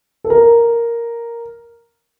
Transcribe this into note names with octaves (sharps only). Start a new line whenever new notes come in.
A4
A#4